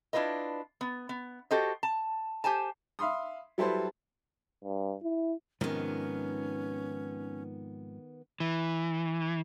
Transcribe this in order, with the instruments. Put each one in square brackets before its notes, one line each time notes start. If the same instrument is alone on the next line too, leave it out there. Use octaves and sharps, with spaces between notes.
[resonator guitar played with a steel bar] D4 E4 F4 B4 D#5
B3
B3
F#4 G4 A4 C5 D#5
A5
G4 C5 G#5 A5
[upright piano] E5 F5 B5 C6 D#6
F#3 G3 E4 A4 B4 C5
[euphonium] G2
E4
[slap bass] G#2 C3 F3 [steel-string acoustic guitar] D#3 B3 [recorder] C#4
[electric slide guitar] E3